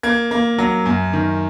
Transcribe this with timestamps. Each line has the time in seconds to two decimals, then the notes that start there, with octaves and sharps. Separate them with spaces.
0.03 A#3 G#6
0.31 A#3
0.58 F#3
0.86 F#2
1.13 D#3